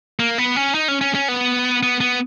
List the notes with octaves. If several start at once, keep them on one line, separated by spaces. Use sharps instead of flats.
A#3
B3
C#4
D#4
C#4
C#4
C#4
B3
B3
B3